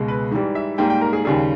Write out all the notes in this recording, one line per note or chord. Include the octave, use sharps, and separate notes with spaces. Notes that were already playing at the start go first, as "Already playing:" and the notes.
Already playing: C#2 B2 G#3
B4
G#2 E3 G3
E5
G#2 G3 A#3 G5
G5
A#4
G#4
D#2 C#3 G3 G#4